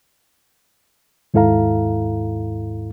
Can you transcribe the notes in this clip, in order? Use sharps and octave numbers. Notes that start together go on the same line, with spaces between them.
D#2 G#2 E4 A4 F5 A#5